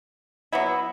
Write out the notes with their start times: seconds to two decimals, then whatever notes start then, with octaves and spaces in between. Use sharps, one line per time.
0.52 F#3 B3 E4